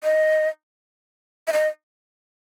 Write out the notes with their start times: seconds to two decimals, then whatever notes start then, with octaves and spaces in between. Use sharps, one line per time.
0.04 D#5
1.47 E5
1.53 D#5